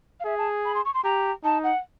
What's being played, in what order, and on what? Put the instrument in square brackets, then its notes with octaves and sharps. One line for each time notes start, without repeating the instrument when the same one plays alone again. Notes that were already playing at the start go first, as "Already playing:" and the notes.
[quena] F5
[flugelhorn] G#4 [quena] E5
[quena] A5
B5
C6
C#6
C6
[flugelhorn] G4 [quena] A#5
[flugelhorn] D#4 [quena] A5
[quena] F#5